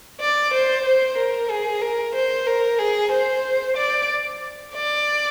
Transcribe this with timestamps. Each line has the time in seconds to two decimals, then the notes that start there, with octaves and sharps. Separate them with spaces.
0.21 D5
0.53 C5
0.85 C5
1.18 A#4
1.50 G#4
1.82 A#4
2.15 C5
2.47 A#4
2.79 G#4
3.12 C5
3.77 D5
4.74 D5